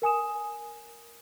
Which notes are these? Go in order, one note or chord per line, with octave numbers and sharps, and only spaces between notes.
A#4 G#5 D#6 E7